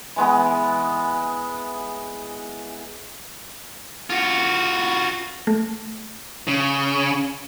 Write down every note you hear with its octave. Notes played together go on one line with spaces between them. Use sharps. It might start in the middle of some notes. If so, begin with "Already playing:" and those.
E3 G#3 B3
F4 F#4
A3
C#3